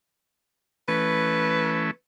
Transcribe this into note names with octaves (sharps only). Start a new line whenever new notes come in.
E3 A3 C#4 B4